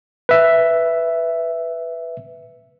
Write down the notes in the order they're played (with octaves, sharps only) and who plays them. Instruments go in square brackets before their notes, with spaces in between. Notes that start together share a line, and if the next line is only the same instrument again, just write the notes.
[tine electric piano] B4 E5